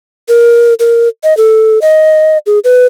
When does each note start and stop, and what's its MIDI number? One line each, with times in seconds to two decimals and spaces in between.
0.29 0.74 70
0.80 1.08 70
1.24 1.36 75
1.37 1.79 69
1.82 2.38 75
2.46 2.59 68
2.64 2.87 71